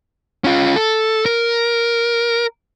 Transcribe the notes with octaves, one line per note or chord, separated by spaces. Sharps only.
C#4 F4
A4
A#4